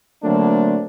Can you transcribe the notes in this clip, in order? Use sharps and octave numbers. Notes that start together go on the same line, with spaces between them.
D3 F#3 A3 A#3 C4 D4